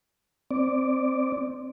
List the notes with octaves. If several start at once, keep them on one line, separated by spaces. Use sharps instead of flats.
C4 D5